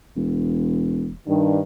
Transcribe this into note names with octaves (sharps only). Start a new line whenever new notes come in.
E1
G2 D#3 D4